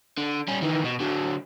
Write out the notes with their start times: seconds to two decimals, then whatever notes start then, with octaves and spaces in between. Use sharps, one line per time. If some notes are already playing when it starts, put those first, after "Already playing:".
0.18 D3
0.48 G3 C#4
0.62 D#3 E3
0.85 B2
1.00 D3 F#3